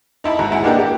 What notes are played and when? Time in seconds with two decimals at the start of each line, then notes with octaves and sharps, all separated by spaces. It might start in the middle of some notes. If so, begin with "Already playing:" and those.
0.24 D#4 E4 A5 B5
0.39 G#1 F#4 A#5
0.51 G#3 E4 G#4 F#5
0.63 A#3 D4 D#4 F#4 G4 A#4
0.79 G4